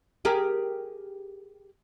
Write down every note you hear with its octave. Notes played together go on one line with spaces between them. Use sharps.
G4 G#4 A#4